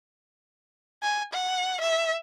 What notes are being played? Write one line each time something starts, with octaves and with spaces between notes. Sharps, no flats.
G#5
F#5
E5